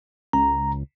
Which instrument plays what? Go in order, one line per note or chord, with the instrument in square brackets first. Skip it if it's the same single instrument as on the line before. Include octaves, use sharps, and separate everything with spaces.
[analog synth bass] C#2 [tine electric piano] A#5